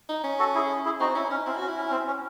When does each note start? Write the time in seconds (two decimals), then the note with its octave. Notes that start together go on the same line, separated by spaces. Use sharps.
0.09 D#4
0.24 C#4
0.39 F#4 A4
0.55 E4 G#4
0.85 E4 G#4
1.00 C4 D#4 F#4
1.15 C#4 E4
1.30 C#4 D#4
1.46 C4 E4
1.57 C#4 F#4
1.68 E4
1.77 C#4
1.87 C#4
1.91 C4
2.07 C#4